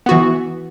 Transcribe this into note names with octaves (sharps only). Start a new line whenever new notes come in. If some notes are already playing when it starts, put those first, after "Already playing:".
E3 B3 F#4